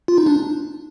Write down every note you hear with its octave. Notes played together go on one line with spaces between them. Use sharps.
F4
D#4
D4